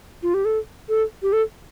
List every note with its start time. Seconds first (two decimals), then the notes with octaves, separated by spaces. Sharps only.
0.23 F4
0.34 G4
0.45 A4
0.89 A4
1.23 G4
1.33 A4